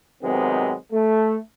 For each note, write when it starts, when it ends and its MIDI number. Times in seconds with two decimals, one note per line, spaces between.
0.23 0.74 48
0.23 0.74 51
0.23 0.74 54
0.23 0.74 56
0.23 0.74 59
0.23 0.74 60
0.92 1.37 57